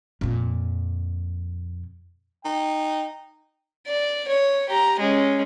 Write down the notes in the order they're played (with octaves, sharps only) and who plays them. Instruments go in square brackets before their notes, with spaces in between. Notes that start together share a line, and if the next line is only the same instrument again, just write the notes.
[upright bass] F2 A#2
[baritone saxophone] D#4 [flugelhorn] G5
[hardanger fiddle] D5
C#5
G4 A#5
G#3 C#4